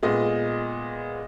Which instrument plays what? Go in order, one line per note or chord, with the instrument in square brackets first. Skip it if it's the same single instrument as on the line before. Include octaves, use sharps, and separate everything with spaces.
[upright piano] A#2 G#3 B3 D#5